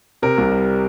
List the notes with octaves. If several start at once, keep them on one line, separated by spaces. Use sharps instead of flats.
C3 A#4
C2
G3